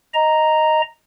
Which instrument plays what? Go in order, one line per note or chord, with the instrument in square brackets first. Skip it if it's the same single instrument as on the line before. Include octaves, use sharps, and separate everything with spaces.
[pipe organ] D#5 A#5